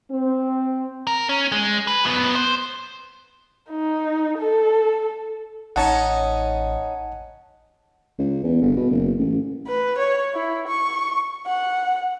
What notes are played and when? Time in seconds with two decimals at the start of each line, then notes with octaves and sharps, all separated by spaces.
0.11 C4
1.07 A#4
1.29 C#4
1.52 G#3
1.87 B4
2.05 F#2 B3
2.35 C5
3.70 D#4
4.38 A4
5.76 A1 C#4 D#4 F#5 A5
8.19 C#2
8.44 E2
8.62 G1
8.76 B2
8.91 F#1
9.19 A1
9.67 B4
9.98 C#5
10.34 E4
10.67 C#6
11.46 F#5